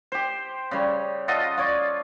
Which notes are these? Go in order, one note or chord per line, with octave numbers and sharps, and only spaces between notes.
G4 C5
C#3 G3 C#5
F4 A4 D#5 F#5
F4 C#5 D5